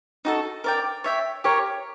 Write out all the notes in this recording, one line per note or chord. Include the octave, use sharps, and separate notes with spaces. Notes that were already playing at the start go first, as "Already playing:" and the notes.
D#4 F#4 A4
A#4 D5 G5
C#5 E5 G5
G4 A#4 C#5